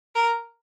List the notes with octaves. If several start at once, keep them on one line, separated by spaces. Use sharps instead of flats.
A#4